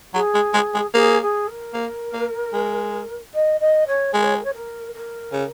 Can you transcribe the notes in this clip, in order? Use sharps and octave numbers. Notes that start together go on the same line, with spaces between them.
F#3 G#4
G#3
G#3
G#3
A#3 G#4
G#4
A#4
A#3
A#3
G#3
D#5
D#5
C#5
G#3 A#4
C#5
A#4
C#5
A#4
A#4
C#3